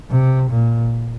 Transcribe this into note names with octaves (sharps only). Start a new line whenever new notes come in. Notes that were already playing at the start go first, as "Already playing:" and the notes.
C3
A#2